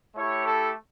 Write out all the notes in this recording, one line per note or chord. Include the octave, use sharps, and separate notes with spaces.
A3 E4 G4 C#5
A4